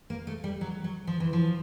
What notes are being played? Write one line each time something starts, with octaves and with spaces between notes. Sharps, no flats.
A#3
A3
G3
F#3
F#3
F3
E3
F3